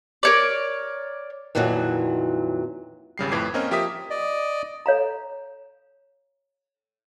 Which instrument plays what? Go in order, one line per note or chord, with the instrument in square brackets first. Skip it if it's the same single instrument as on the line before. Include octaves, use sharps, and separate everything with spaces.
[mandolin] A#4 C#5 D5
[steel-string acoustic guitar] F2 A#2 D#3 E3 F#3
[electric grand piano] G#1 C#3 G3 C7
F2 A2 B4 D6 G#6 C7
A#3 C4 C#4 A#4 D#5
F3 G4 A#4 E5 D#6 B6
[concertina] D5 D#5
[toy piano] A4 C#5 F5 A#5